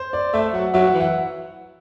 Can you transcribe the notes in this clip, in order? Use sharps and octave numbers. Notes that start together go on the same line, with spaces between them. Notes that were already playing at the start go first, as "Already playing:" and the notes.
Already playing: C5
D5
A3 E5
F#3 F#5
F#3 E5
F#5
E3
F#5